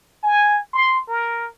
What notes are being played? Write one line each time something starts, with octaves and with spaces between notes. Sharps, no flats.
G#5
C6
A#4